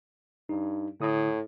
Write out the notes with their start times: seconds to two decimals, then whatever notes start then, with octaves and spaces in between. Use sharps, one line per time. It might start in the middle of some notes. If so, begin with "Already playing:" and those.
0.49 G2 D#4
1.00 A2 D3 E4 D#6